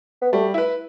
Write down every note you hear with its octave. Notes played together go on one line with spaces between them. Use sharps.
B3
G3 A3
E4 B4